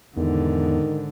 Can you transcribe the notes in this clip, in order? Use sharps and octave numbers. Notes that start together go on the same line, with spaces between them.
E2 G#2 D3 D#3